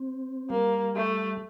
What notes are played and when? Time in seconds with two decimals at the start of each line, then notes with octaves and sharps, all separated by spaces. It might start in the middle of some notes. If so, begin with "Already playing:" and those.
Already playing: C4
0.50 G3 A#3
0.96 A3